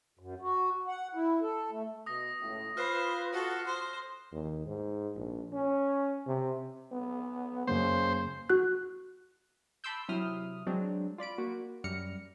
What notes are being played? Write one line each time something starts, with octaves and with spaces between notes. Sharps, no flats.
F#2
F#4
F#5
E4
A4
A3
B2 D#6 A#6
C#2 A2
F4 B4 C5 F6 F#6 C7
F#4 A4
C5 C6
D#2
G#2
A#1
C#4
C3
B3
F#2 C#3 F#3 A#3 C5
F#4 F#6
A5 B5 C6 D6 E6 G6
C3 F#3 E4 D#6 F6
F#3 G#3 C4 D4
F4 D5 B5 D7
A#3 F#4
F#2 G3 F6 A#6 C#7